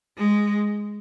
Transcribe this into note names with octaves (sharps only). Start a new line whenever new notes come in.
G#3